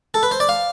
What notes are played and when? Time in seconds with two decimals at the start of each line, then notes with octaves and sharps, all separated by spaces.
0.14 A4
0.23 B4
0.31 C5
0.40 D5
0.49 F5